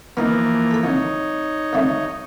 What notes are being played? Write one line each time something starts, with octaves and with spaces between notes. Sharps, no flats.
E3 F3 A#3 B3 D#4
A4 B5
C2 D#4 C#5
C2 G3 A3